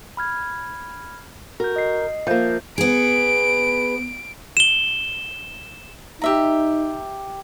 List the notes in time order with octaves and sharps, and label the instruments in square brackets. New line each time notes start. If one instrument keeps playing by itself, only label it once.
[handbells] B5 F6 G#6
[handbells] F#4 G6 [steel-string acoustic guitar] A#4
[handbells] D#5 C7
[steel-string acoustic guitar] F3 A#3 [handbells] E5 G6
[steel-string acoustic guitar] B3 G#4 [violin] D7
[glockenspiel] E7 G7
[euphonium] D#4 [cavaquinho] G4 E5 A#5